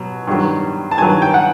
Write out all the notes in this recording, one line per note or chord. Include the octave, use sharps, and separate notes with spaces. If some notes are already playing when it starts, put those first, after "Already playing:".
Already playing: B2 F#3
G2 D#3 F#3
A5
G2 D#3 F#3 G#5
G5
F#5